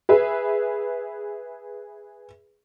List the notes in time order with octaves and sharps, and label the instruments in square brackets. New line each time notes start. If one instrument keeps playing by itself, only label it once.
[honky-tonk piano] G#4 B4 E5